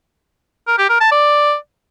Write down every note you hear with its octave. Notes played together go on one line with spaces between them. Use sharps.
A#4
G4
A#4
A5
D5